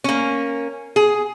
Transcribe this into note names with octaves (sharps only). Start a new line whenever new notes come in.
A#3 C#4
G#4